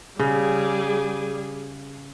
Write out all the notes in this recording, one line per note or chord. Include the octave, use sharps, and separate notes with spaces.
C#3 G3 G#4